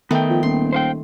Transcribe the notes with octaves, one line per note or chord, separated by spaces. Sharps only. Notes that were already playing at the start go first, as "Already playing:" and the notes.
D#3 A3 B3 G5
F3
D#1 C6
C5 F5 G5